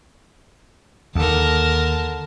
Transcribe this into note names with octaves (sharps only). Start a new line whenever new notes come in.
D#2 D3 A#4 A5